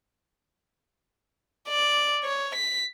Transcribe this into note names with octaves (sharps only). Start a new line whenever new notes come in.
D5
C#5
B6